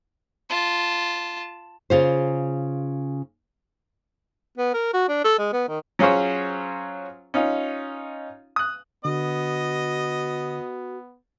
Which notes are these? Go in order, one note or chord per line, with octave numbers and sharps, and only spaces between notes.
F4 A5
C#3 F4 C5
B3
A#4
F#4
D4
A4
G#3
B3
D#3
F#3 C#4 F4 G#4 C5 C#5
C#4 D#4 F4
D#6 F#6
D3 B3 F#4 D#5